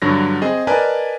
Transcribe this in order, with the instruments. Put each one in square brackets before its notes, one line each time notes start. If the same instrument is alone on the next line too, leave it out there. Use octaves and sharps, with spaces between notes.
[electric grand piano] G2 D3 F#3 A#6
C4 G#4 D#5
A#4 B4 D5 D#5 G#5 A5